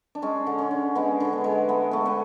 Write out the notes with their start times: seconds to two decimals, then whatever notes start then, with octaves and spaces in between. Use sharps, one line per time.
0.15 D4
0.22 G#3 C#4
0.46 D3
0.58 C#4
0.71 D3
0.95 G#3 B3
1.20 D3
1.33 B3
1.44 G#3
1.69 A3 B3
1.91 A3 B3
2.05 B3